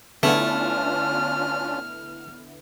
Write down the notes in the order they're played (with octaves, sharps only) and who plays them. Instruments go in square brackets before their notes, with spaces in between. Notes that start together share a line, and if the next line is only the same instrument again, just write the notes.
[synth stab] D3 B3 E4 [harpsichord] A3 [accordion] C#4 D4 F4 [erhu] F6